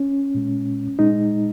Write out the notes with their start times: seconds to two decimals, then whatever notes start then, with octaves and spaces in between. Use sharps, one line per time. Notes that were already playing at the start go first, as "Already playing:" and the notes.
Already playing: C#4
0.35 A#2 G#3
0.99 A#2 G#3 D#4